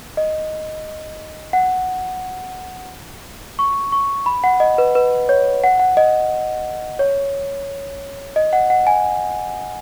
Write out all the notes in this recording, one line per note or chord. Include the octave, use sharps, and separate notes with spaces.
D#5
F#5
C#6
C#6
B5
F#5
D#5
B4
B4
C#5
F#5
F#5
D#5
C#5
D#5
F#5
F#5
G#5